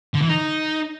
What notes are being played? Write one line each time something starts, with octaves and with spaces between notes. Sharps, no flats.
D3
E3
D#4